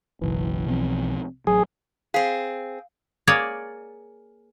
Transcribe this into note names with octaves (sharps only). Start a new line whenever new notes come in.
F#1 B1 E3
B2 F3 C4
A1 F#3 G#4
C4 G#4 F5
A#3 G#4 C#5 D5